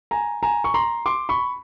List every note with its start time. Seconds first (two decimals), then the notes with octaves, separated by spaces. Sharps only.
0.11 G#5 A#5
0.43 G#5 A#5
0.64 C#6
0.74 A#5 C6
1.06 C6 D6
1.29 B5 C#6